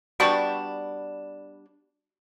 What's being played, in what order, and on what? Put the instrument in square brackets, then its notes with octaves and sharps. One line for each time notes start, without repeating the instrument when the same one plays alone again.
[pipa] G3 B3 D4 [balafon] F#4 C#6